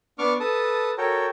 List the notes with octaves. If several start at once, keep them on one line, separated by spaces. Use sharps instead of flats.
B3 D4 C#6 D6 F6
A4 B4 A5 D#6
F#4 A4 A#4 C#5 G5